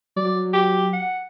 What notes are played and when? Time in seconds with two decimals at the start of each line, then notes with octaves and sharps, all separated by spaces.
0.17 F#3 D5
0.54 G4
0.93 F#5